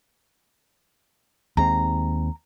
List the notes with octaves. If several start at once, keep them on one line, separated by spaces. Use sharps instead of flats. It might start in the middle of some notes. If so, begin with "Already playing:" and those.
D#2 G#3 C4 A#5